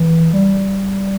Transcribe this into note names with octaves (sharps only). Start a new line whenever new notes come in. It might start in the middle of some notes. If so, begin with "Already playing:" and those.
Already playing: E3
G3